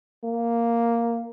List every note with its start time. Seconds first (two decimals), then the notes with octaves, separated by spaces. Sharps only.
0.24 A#3